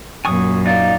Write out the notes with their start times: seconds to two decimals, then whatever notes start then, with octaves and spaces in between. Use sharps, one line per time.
0.25 F#2 A#2 G#5 C#6 D#6
0.66 D#4 D5 F5